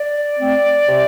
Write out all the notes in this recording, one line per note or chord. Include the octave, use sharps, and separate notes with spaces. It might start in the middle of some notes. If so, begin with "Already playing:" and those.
Already playing: D5
A3 C4
C3